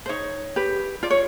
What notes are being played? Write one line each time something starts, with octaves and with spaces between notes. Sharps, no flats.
C5
D#4 C#5
G4 B4
F4 D5
C#5